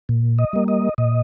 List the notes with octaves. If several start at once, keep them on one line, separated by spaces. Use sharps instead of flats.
A#2
D#5
G3 A#3
D#5
A#2 D#5